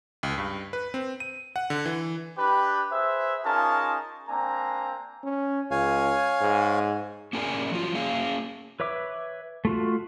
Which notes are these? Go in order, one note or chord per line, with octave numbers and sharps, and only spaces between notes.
C#2
G2
B4
C4
D#7
F#5
D3
E3
D4 G4 B4
G#4 B4 C5 E5
C#4 D#4 F4 G#4 A#4 A5
A#3 C4 D4 G#5 A#5
C#4
C#2 C#5 F5 G#5
G#2
A#3 C#4 G#4 A#4 D5 G#5
F3 F#3 F4
A#3 C#4 G#4 F5
B4 C#5 E5 D6
A3 F4 F#4